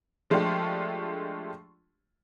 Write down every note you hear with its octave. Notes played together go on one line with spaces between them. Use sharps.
F3 G#3 A3 D4 F4 G4